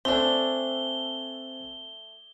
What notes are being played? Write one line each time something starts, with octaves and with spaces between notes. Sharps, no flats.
A3 C4 D4 A4 C5 G#5 G7